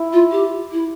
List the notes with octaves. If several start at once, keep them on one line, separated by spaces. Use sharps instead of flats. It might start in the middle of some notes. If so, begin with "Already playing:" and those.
Already playing: E4
F4
G4
E4